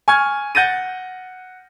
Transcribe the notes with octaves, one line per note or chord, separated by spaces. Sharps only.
G#5 C#6 F6 G#6
F#5 G6 A6 A#6 D#7